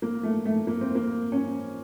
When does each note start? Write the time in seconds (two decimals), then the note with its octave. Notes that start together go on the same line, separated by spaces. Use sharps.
0.02 A#3
0.23 A3
0.45 A3
0.67 A#3
0.81 C4
0.95 A#3
1.32 C#4